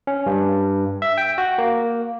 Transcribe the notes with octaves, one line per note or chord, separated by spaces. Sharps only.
C#4
G2
E5
G5
F#4
A#3